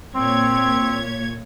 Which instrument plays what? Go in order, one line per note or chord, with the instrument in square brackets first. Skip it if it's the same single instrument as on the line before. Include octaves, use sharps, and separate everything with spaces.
[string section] A#2 C#5 G#6 [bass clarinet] C4